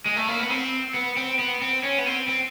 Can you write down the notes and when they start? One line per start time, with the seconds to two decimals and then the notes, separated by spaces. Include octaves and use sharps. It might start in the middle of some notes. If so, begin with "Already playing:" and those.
0.06 G#3
0.16 A3
0.28 A#3
0.39 B3
0.50 C4
0.94 B3
1.17 C4
1.39 B3
1.62 C4
1.83 C#4
1.98 B3
2.06 C4
2.28 C4